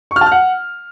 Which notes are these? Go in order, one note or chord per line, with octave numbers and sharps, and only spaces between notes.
C#6
F6
A5
F6
F#5